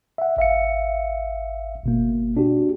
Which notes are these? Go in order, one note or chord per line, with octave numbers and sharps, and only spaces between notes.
E5 F#5
G#1 E5 F5 C#7
G1 B2 A#3
D4 F#4 G4